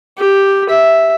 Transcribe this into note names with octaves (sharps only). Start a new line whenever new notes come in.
G4
E5